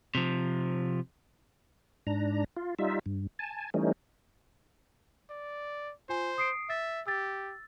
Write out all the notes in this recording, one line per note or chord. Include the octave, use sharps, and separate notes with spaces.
C3 F3
G#2 D4 A#5
F4
G3 D#4 F4 E5
G2
G#5 A5
E3 G3 A3 C#4 D#4
D5
F4 C5 G#5
D#6 C7 D7
E5 A6
G4 E6 A6